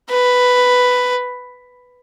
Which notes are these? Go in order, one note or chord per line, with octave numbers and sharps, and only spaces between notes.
B4